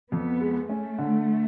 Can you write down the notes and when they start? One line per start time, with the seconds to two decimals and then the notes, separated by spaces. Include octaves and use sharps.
0.12 F2 B3
0.41 G#3
0.69 A3 C#4
0.98 D3